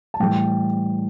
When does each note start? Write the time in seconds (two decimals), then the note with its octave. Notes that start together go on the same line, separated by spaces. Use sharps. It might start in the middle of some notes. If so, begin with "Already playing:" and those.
0.14 A5
0.20 A2 E3 G3 G5